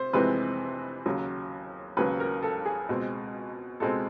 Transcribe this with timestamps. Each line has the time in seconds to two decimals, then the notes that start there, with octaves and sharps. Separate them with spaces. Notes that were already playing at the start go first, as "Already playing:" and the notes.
Already playing: C3 C5
0.13 F2 C3 E3 G#3 C4 B4
1.06 D#2 C#3 F#3
1.97 D#2 C#3 F#3 B4
2.20 A#4
2.43 A4
2.65 G#4
2.89 C#2 B2 G#3 C4
3.80 C#2 B2 G#3 C4 A4